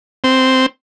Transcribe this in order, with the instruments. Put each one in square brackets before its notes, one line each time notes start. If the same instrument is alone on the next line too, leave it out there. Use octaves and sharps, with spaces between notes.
[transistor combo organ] C4